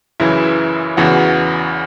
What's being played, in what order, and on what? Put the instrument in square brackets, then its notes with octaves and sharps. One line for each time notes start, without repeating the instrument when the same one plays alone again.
[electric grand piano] F#2 C#3 E3 E4 E5
E2 C#3 E3 F#4 F#5